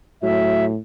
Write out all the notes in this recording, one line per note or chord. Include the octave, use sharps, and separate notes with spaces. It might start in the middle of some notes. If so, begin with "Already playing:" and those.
A2 F#3 E5